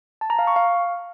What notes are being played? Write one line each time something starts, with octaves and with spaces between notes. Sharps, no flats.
A5
A#5
F5
C#6
F5